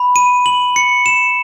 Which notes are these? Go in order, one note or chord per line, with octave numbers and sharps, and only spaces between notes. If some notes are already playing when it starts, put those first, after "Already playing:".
Already playing: B5
D#7
F#7
C#7
E7